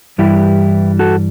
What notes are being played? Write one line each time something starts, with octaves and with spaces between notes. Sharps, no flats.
G2 E3 G3 E4 G4
F#4 A4